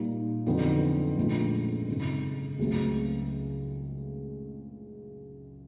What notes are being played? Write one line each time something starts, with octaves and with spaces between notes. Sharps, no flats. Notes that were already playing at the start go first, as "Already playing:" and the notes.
Already playing: A#2 G3 A#3 D#4
F2 D3 F#3 B3 D#4
A#1 G#2 F3 A3 C#4
G#1 F#2 C#3
C#2 C#3 F#3 A3 C4